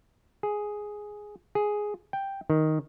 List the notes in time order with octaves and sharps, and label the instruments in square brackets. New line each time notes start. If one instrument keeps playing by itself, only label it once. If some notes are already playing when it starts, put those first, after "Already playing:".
[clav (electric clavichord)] G#4
G#4
G5
D#3